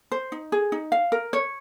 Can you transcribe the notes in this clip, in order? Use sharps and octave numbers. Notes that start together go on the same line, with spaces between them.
C5
D#4
G#4
D#4
F5
A#4
C#5